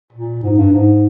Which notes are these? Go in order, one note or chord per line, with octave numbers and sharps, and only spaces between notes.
A#2
G#2
G2
G#2